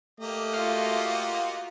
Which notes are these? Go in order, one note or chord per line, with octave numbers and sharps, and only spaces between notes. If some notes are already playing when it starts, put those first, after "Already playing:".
A3 A#3 G4 D#5
F4 F#4 F5